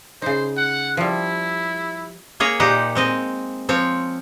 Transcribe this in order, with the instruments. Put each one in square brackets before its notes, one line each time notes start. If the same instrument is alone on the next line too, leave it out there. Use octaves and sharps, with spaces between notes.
[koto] C#3 D#4 [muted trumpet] C5
[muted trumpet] F#5
[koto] F3 G3 [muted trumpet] E4
[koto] A#3 G#4 C#5 A#5
A#2 D#4 G4 C5 F#5
G#3 C4 D#5
F3 C4 C#5